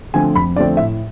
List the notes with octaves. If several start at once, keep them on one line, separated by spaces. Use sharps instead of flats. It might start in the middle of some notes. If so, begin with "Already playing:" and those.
D3 F3 A3 C4 G#5
F2 B5
D3 F3 A3 C4 D5
A2 E5